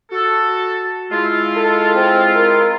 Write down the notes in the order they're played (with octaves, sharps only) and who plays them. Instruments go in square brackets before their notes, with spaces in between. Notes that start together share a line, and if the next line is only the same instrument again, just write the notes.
[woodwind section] F#4 A4
G#3 E4 F4
[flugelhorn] A4
C4
A#4